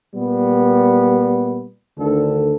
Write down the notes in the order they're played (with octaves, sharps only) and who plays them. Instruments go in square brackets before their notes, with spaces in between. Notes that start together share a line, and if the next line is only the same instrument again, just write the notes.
[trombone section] A#2 G3 B3
D2 D3 D#3 A4